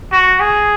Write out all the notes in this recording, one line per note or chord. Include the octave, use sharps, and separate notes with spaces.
F#4
G#4